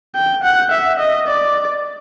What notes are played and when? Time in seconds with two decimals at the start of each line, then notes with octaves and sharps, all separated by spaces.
0.15 G5
0.44 F#5
0.72 E5
1.00 D#5
1.28 D5